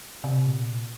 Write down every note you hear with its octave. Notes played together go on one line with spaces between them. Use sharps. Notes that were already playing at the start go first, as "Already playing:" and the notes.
C3
A#2